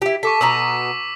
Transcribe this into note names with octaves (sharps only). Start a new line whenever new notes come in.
E4 G4
A4 C#6 D6 B6
B2 B3 A#5 C#6 E6 B6